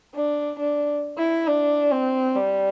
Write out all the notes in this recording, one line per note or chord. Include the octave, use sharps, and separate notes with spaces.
D4
D4
E4
D4
C4
G3